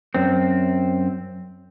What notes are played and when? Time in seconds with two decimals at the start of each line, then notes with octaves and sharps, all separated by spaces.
0.14 F#2 C4